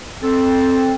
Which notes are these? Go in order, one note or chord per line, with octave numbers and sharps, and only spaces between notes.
C4 A4